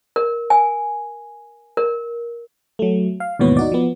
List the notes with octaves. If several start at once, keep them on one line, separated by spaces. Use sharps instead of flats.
A#4
G#5
A#4
F#3 A3
F5
D#2 G#2 B2 E3 B3 C#5
D#4 F#4 D5
F3 B3